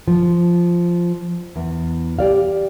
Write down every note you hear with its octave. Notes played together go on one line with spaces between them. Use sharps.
F3
E2
G4 D5 F5